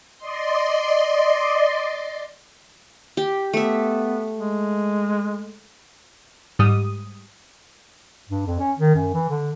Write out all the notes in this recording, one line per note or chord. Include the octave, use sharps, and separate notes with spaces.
D5 D#5 C6
G4
A3 B3 E5
G#3
G#2 G3 D#6
G2
F2
C#4
D#3
F#2
E3
D3